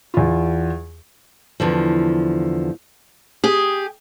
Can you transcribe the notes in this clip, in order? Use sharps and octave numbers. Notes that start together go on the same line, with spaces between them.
E2 F4
E2 D3 F3
G4 G#4